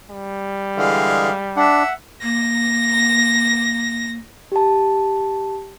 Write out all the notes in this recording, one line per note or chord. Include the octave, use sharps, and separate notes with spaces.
G3
D3 E3 G#3 G#4 F5
D4 E5 F#5
A#3 A#6
G4 A5